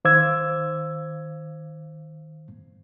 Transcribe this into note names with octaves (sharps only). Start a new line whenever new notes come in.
D#3 C5 F5 D6 E6 G#6